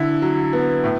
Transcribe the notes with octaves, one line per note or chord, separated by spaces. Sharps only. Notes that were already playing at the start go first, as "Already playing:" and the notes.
Already playing: D3 E4
F#3
B3
A2